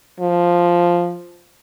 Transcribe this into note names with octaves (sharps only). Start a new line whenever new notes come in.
F3